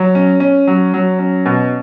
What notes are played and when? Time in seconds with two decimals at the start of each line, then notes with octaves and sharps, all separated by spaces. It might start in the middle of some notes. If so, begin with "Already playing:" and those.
Already playing: F#3
0.15 C#4
0.40 C#4
0.67 F#3
0.94 F#3
1.19 C#4
1.46 B2